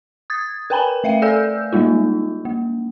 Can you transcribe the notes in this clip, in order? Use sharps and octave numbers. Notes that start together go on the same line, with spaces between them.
D#6 G#6 A6
A#4 B4 G5 G#5 A#5 B5
A3 E5 F5 G5
A4 D5 G#5 E6 G6
G3 G#3 A#3 D#4 F4
A#3